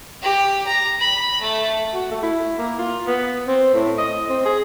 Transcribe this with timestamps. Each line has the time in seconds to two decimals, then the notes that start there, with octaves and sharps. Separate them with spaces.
0.22 G4
0.66 A#5
0.99 B5
1.41 A3
1.94 F#4
2.11 A3
2.23 E4
2.58 A#3
2.79 F4
3.07 B3
3.48 C4
3.74 A2
3.98 D#5
4.29 C4
4.45 G#4